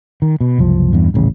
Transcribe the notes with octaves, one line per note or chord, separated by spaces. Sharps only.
D#3
B2
F#1 C2 F3
E2 G2
D#1 A1 C#3